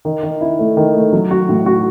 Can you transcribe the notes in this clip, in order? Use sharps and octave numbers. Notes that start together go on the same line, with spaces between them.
D#3
D#3
E4
A3
D#3
A3
F#3
F#4
A2
F#4